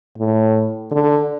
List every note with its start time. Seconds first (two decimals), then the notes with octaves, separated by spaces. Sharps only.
0.18 A2
0.92 D3